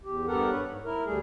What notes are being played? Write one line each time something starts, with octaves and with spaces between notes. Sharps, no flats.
E2 G4
G2 B3 G4 A4 A#4 F#5
B4 C#5
G#2
E4 A#4
D2 G3 A3 G#4